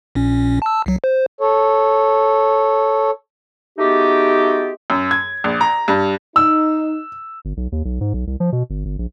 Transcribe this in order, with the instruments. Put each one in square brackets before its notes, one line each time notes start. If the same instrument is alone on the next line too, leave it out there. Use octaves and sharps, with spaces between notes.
[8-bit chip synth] A#1 A#2 C#4
A5 E6
C2 F#3
C5
[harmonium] A4 C#5
[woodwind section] G#3 A3 B3 D#4 F#4 G4
[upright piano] F#2
G#6
A#1
A#5
G2
[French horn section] D#4 [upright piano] E6
[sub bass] G1
B1
D#2
B1
G#2
B1
C2
F3
B2
G1
G1
A#1